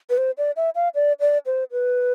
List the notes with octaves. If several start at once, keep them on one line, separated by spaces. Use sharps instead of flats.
B4
C5
D5
E5
F5
D5
D5
C5
B4